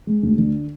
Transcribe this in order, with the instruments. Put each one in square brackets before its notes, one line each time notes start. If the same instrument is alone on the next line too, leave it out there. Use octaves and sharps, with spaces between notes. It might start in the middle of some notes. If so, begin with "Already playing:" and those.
[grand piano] G#3
D2
D3